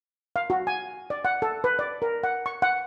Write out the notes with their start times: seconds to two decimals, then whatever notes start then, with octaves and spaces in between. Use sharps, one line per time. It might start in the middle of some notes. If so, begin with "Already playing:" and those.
0.36 F5
0.50 F#4
0.67 G#5
1.10 D5
1.25 F#5
1.42 A4
1.64 B4
1.79 D5
2.02 A#4
2.24 F#5
2.46 C#6
2.62 F#5